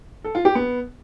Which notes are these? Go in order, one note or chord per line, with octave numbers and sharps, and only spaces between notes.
A4
F4
G4
B3